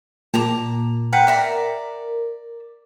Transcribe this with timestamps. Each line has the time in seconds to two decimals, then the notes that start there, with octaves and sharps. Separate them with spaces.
0.34 A#2 A5 A#5 D6
1.13 A#4 B4 F#5 G5
1.27 D5 E5 A#5